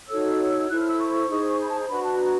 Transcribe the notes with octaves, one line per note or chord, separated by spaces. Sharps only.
D#4 F#4 A4 C#5 E6
E4 A4 C5 F#6
F6
E6
C#6
D#4 G#4 C5
B5
A5
A#5
D4 F#4 B4 B5
A5
A#5